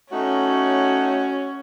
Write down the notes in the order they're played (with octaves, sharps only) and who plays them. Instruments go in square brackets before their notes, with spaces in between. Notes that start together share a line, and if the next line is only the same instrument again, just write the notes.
[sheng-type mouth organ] A3 D#4 [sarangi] C#4 [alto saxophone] F#4 [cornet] C#5